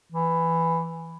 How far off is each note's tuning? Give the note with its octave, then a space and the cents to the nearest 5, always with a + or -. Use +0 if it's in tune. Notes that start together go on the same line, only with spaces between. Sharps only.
E3 +5